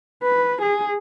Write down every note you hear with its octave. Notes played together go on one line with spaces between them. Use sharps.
B4
G#4